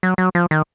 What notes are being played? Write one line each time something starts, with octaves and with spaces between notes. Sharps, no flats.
F#3
F#3
F3
D#3